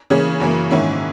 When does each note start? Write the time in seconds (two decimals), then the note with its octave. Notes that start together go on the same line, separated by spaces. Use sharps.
0.10 C#3 E3 A#3 C#4 G#4
0.40 F#2 C#3 E3 A#3
0.70 G#2 D#3 A#3 C#4 E4